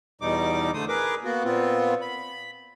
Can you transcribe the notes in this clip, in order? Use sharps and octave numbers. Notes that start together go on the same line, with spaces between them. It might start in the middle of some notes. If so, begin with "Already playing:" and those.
E2 B2 G3 D#4 D6
D3 A3 C5 D#6
G#4 A#4 B4 D6
A#3 B3 F#4
A#2 B3 C4 F4
B5